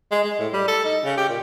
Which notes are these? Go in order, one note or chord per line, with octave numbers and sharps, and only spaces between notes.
G#3
G#3
A2
G3
A4
D#4
C#3
G4
A#2